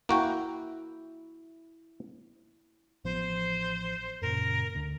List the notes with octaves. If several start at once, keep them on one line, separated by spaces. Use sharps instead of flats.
A#3 E4 F#4 G5
A1 F3 B3 C5
F#2 A#2 C#3 A#4
D2 D3